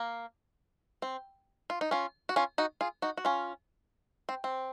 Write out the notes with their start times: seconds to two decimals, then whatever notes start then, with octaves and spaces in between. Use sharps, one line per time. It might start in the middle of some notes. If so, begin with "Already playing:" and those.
Already playing: A#3
1.02 C4
1.70 F4
1.81 D#4
1.91 C#4 F4
2.29 F#4
2.36 C#4 F4
2.58 D#4 F#4
2.81 F4 G#4
3.02 D#4 F#4
3.17 F#4
3.25 C#4 F4
4.29 C4
4.44 C4